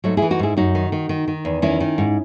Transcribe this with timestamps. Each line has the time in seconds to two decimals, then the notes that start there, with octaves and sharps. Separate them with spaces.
0.04 G#2 F#3 A3
0.17 E4 G#4
0.22 E3
0.31 D#4 F#4
0.39 G#2 E4 G#4
0.57 F#2 D#4 F#4
0.75 D#3
0.92 D#3
1.09 D#3
1.28 D#3
1.45 E2
1.62 D#3 C#4 E4
1.80 D#3
1.98 G#2